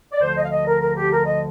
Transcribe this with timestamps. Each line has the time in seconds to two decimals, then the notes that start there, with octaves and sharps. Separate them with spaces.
0.12 D5
0.21 D2 D3 F3 C5
0.36 D#5
0.43 F5
0.51 D#5
0.65 A#4
0.80 A#4
0.95 G4
1.10 A#4
1.25 D#5